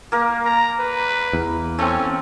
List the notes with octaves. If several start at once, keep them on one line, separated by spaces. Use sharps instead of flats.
A#3 A#4
A#5
B4
E2
A3 C4 C#4